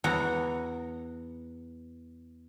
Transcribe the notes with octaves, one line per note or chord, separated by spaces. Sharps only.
E2 F#5 A#5